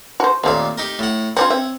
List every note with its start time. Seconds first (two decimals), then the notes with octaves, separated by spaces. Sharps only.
0.20 F#4 C5
0.44 D#2 A#2 A3 C4 F5
0.78 D#4 G4 A#4
0.99 A2 F#5
1.37 C4 D4 F4 C#5 F#5
1.50 C4 E5